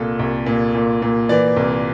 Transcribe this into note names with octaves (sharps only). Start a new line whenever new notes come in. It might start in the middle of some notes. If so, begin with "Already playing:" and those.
Already playing: C2 A#2 A4
C2
A#2
A#2
A#2
E3 D5
C2